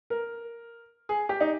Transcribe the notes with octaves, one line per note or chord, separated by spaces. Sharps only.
A#4
G#4
G4
D#4